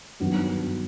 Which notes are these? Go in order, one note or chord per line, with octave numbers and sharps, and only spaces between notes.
G2 D#3 F#3 B3